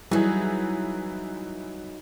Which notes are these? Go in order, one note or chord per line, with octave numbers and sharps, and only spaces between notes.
E3 F#3 G3 D#4 G#4